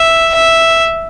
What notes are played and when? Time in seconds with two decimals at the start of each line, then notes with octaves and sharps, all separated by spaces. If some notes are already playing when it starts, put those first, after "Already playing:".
Already playing: E5
0.35 E5